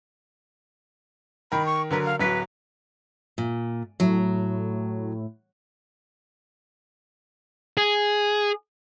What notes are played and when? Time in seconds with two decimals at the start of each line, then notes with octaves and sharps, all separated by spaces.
1.52 D#3 A#4 B5
1.66 C#6
1.91 D3 F#3 A#4 B4
2.05 F5
2.20 D1 F#3 B4 B6
3.38 A#2
4.00 A2 F#3
7.77 G#4